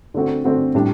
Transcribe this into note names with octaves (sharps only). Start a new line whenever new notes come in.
D3 A3 C4 F#4
D3 A3 C4 F#4
A2 G3 D4